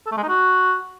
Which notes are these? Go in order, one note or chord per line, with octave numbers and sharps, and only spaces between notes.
A4
A3
G#3
D#4
F#4